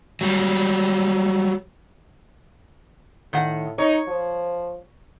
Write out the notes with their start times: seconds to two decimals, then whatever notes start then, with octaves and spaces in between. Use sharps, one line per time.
0.21 F#3 G3
3.33 A2 D#3 F#5
3.78 D#4 C#5
4.08 F3